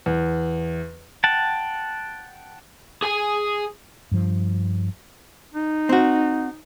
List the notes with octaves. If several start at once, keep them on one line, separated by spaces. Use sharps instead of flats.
E2
F#5 G5 A5
G#4 G#5
G2 F3
D#4
C4 F#4